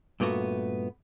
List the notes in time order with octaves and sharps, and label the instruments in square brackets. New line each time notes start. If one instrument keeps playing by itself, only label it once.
[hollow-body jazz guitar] G2 A#2 A3 B3 F#4